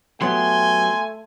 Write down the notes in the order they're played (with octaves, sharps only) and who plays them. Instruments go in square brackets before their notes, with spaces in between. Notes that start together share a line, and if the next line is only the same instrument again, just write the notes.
[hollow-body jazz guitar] F#3 B3 G4 [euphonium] A3 [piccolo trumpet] G#5 [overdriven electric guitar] C6